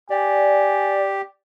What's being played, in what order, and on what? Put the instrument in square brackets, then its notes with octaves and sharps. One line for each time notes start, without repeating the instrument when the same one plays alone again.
[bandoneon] G4 [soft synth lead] D5 [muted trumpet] G#5